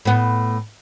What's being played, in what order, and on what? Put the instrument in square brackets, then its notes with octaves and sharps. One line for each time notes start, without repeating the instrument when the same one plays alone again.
[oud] A2 B3